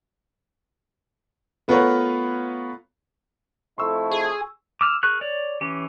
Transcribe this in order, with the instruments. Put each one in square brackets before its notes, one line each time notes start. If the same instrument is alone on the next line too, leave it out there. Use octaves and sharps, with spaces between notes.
[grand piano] A3 B3 F4 A#4 B4 C#5
[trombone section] F2 A3 E4 [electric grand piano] C6 C#6 E6
[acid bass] G#4
[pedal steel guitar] D6 E6 F6
G#4 A#4 C#6 F#6
C#5 D5
E3 C#4 G4